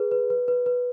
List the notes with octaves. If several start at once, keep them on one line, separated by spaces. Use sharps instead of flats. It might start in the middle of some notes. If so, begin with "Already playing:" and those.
Already playing: G#4 B4
B4
B4
B4
B4